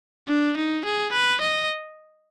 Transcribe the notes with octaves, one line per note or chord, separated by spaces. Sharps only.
D4
D#4
G#4
B4
D#5